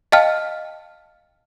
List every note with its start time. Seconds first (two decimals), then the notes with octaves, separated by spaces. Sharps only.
0.12 D#5 F5 G5 A5 F6